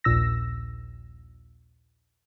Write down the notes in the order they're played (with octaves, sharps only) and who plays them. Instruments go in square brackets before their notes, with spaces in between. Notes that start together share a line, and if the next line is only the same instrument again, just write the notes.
[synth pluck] A#1 D#2 A#2 E6 A#6